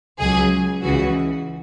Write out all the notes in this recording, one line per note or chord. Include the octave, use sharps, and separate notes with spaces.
C#2 C#3 F#3 G#4
C#2 C#3 E3 F#4